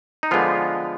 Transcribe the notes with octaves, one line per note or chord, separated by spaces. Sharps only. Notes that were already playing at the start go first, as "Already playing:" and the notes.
D#4
D3 F3 G#3 B3 F4